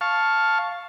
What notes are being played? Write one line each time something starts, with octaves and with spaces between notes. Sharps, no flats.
F5 A5 C#6